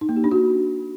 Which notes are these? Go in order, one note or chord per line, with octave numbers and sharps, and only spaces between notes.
D#4
A#3
G4
D4
F#4